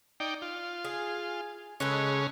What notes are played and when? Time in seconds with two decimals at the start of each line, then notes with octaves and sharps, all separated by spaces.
0.20 D#4 D5 G5
0.42 F4
0.85 G#4
1.80 C#3 G#3 C#4 A4 B4